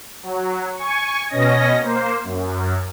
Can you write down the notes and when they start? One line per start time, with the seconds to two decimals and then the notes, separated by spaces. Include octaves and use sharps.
0.23 F#3
0.77 G#5 C#6
1.28 B2 C#4 D#5 A#6
1.80 A#3 C5
2.24 F#2